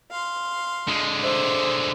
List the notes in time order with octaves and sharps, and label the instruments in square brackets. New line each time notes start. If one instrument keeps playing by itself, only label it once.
[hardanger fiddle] F5 C6
[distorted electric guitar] D3 G#3
[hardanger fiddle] C5 E5